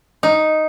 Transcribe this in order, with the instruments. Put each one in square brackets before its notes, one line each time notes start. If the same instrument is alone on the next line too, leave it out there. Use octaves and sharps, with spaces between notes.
[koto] D#4